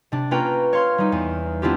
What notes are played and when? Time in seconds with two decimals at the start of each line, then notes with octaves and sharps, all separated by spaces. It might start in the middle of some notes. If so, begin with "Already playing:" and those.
0.12 C3 D4
0.31 A#3 C#4 F4 B4 G5 A#5
0.73 C#5 F5 C6 F6 G#6
0.98 G3 D#4
1.12 E2
1.62 B3 C4 D4 E4 F4 G4